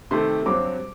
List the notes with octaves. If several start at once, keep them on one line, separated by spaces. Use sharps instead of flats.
C3 D#3 A3 C6
G2 F#3 C4 D6